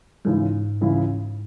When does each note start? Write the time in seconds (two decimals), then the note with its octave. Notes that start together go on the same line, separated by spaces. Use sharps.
0.25 C#2 G#2 C#3 E3 G#3 E4
0.81 C#2 C#3 E3 G#3 E4